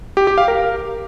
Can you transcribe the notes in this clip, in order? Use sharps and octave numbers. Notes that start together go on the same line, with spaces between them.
G4
G4
F5
A#4